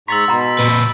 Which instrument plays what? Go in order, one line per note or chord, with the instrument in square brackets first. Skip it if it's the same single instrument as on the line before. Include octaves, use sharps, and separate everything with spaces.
[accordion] G#2 A#5 C#6 [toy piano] C6 [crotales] E6 A6 B6
[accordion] B2 [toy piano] F#5 A#5 C6
[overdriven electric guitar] A#2 B4